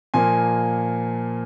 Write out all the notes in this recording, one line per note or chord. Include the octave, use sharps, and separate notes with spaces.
A#2 F3 A#3 G#5 C6